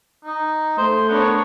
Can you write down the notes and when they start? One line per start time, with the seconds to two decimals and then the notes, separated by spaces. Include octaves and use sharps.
0.25 D#4
0.78 A3 C5
1.08 B3 D4 A#4 C#5